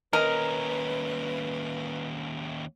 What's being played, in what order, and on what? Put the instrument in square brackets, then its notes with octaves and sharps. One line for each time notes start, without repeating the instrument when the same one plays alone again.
[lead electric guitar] D#2 C#4 [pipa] A#4 [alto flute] B4 [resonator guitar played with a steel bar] D#5